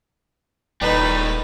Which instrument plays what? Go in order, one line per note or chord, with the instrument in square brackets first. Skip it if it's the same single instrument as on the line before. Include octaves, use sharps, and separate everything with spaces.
[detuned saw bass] D#1 [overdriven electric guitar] A2 G3 [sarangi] D#4 [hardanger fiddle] B4